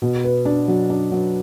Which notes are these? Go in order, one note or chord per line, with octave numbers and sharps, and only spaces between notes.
B2
B4
D4
F#3
D4
F#3